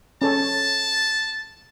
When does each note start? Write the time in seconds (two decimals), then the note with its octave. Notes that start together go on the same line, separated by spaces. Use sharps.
0.22 C#4 A4 C#5 A5